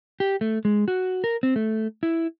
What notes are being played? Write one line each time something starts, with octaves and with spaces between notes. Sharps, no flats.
G4
A3
G#3
F#4
A#4
C4
A3
E4